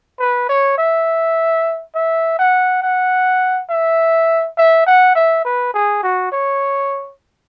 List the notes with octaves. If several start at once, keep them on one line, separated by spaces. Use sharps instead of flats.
B4
C#5
E5
E5
F#5
F#5
E5
E5
F#5
E5
B4
G#4
F#4
C#5